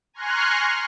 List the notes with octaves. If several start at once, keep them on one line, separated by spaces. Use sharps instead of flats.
G#5 A#5 C6 C#6 F6 F#6